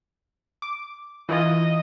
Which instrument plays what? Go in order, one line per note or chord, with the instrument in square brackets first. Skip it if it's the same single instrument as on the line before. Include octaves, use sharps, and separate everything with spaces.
[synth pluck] D6
[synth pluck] E3 E4 F4 [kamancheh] D#5